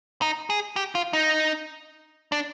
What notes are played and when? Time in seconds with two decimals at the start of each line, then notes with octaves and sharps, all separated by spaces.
0.22 D#4
0.50 G#4
0.76 G4
0.95 F4
1.13 D#4
2.32 D4